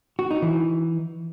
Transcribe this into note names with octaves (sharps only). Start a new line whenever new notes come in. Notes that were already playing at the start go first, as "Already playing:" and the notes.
F#4
D#4
E3